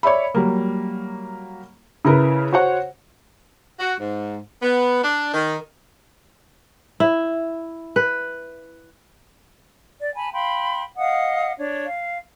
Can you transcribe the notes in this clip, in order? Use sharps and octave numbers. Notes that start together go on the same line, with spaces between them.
C#5 D5 E5 B5
F#3 G3 A#3
C#3 E4 A#4 B4
F#4 C5 C#5 F#5
F#4
G#2
B3
D4
D#3
E4
B4
D5
G#5 A5 B5
F5 G5 B5 C6
D#5 F5 F#5 D#6
D4 C#5
F5